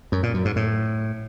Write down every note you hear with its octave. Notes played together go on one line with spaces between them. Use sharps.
F#2
A#2
F#2
G#2
A2